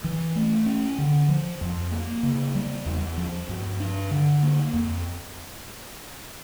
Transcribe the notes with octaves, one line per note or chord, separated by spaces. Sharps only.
E3
A3
C#4
D3
F3
F2
A#3
C#3
G3
E2
F3
G2
D4
D3
A#3
F2